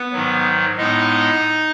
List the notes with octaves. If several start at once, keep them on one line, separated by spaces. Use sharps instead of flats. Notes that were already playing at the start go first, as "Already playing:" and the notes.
Already playing: B3 B4
G#2 D#3 F#3
A2 G#3 B3 D#4 D#5